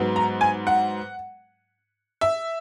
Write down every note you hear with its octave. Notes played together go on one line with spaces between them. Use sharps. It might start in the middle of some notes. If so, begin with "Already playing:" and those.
Already playing: G#2 F#3 B3
A#5
G#5
F#5
E5